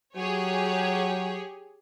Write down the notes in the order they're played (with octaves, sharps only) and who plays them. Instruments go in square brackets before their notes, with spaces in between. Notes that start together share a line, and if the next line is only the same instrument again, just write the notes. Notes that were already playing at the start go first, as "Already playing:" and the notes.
[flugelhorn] F#3 [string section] G4 G#4 C#5